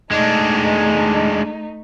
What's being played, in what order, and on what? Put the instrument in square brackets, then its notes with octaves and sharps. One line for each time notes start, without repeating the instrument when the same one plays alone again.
[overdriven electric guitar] G#3 D4 [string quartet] A3 D#4